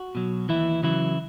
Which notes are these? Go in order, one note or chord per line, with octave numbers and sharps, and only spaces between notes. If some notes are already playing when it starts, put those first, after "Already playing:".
Already playing: F#4
B2 F#3
D#2 E3 E4
C#3 E3 F#3 E4